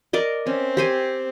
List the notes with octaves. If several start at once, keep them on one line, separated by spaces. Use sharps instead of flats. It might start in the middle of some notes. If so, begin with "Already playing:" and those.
A#4 D5 D#5
C4 C#4
G4 C5 G#5